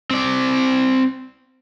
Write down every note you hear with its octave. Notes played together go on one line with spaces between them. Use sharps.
C4 D5